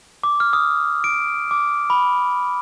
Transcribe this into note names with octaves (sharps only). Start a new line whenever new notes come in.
D6
F6
D#6
D7
D6
B5